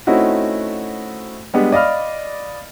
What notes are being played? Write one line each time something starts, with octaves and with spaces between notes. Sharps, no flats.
A3 C4 C#4 D#4 E4 F#4
G3 G#3 B3 D4
D5 D#5 F5 B5 F6